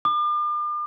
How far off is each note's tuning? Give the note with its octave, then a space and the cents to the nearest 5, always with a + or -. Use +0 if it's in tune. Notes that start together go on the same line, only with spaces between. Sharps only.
D6 +40